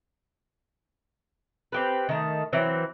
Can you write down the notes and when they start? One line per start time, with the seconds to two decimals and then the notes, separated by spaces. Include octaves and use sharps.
1.72 C4 G4 B4
2.09 D#3 A3
2.53 E3 F#3 C4